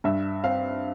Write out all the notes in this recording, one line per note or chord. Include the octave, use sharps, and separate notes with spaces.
G2 E5
C4 F5